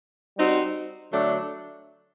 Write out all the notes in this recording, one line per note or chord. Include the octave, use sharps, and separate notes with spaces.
G3 C4 D#4 F#4
D3 F#3 A3 D4